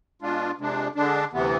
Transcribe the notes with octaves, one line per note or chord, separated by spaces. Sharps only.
B2 G#3 D4 F4
F2 C3 G#3 D4
D3 G#3 D4
D2 C3 E3 B3